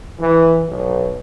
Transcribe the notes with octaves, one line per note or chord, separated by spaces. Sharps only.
E3
B1